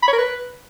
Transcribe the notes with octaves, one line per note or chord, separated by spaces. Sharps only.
B5
C#5
A#4
B4